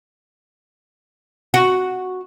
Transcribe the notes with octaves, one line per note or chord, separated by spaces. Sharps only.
F#4